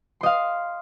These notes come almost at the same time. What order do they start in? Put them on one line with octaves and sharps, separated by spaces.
C6 D#5 F5